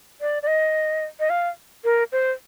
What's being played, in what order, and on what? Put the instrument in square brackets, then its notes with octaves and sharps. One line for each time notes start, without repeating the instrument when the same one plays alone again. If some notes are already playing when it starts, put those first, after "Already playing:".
[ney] D5
D5
D#5
D#5
F5
A#4
C5